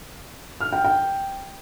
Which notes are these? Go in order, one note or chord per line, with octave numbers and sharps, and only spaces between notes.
F6
G5
G5